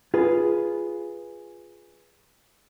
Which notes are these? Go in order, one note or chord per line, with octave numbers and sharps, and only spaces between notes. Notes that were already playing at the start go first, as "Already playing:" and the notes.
F4 G#4 B4